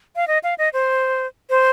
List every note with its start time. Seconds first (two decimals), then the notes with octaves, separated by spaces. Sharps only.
0.16 F5
0.28 D#5
0.44 F5
0.58 D#5
0.73 C5
1.50 C5